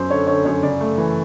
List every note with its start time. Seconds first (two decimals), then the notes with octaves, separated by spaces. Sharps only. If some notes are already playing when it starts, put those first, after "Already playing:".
Already playing: F#2 C5
0.10 D3 C#5
0.27 D3 C#5
0.45 F#2 C#5
0.63 C#3 D5
0.81 A3
0.98 E3